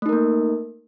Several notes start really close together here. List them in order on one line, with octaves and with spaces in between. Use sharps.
A3 D#4 A#4 A#3